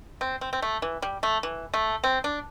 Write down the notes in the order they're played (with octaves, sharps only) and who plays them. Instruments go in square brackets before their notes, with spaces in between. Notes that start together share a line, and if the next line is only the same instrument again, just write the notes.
[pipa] C4
C4
C4
A3
E3
G3
A3
E3
A3
C4
D4